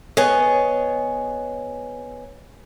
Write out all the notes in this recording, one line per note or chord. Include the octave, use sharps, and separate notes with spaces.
B3 G#4 C#5 D#5